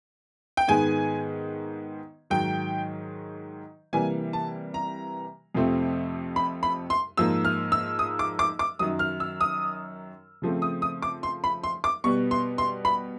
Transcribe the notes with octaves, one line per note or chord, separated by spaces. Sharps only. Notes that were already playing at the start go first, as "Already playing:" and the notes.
G5
G#2 D#3 G#3 B3 G#5
G#2 D#3 F#3 G5
C3 E3 G3 A#3 G#5
A5
A#5
F2 C3 F3 A3 C4
B5
B5
C6
G#2 F3 A#3 E6
F6
E6
D#6
D6
D6
D6
F#2 D#3 F#3 D#6
F6
E6
D#6
C#3 F3 A3 C4
D#6
D#6
D6
C6
B5
C6
D6
B2 G3 B3 C#6
C6
C6
B5